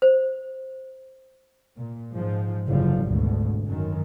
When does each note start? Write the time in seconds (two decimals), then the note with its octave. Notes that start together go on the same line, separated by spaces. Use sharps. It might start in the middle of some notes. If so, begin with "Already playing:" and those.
0.02 C5
1.77 A#2
2.12 G#2 F3
2.67 F#1 D3 F3 G3
3.05 G#1 D2 B2
3.68 F#2 D#3